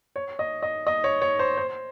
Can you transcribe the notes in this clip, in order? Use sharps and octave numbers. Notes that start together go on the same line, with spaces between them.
C#5
D#5
D#5
D#5
C#5
C#5
C5
C5